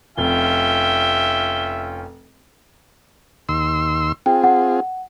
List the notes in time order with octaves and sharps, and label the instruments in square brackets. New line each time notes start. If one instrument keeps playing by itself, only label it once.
[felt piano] F1 [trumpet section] C#4 F4 G5 [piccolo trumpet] E5 [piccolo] G7
[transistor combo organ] D#2 C6 E6
[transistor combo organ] C4 F4 G#4 [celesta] G5
[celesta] F#5